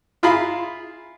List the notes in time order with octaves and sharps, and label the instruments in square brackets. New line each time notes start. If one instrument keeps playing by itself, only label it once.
[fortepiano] E4 F4 G#4 A#5 B5